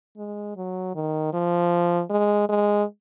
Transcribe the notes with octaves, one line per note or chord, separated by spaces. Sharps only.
G#3
F#3
D#3
F3
G#3
G#3